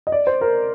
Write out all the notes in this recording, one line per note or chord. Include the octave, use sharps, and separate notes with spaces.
D#5
D5
C5
A#4